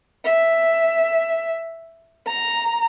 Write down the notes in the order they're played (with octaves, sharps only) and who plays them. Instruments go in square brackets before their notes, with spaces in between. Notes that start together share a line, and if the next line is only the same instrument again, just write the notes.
[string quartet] E5
A#5